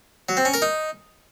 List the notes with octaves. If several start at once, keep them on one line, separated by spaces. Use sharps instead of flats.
F#3
C4
C#4
A#4
D#4